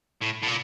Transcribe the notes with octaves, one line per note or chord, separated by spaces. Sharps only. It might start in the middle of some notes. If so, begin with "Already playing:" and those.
A2
A2
A#2